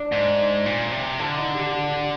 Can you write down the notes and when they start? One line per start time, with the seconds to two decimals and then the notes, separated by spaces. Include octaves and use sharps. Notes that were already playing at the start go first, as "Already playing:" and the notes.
Already playing: D4
0.12 G#2
0.66 A#2
0.92 C3
1.19 D3 F4
1.37 D#4
1.55 G4
1.71 F4
1.90 G4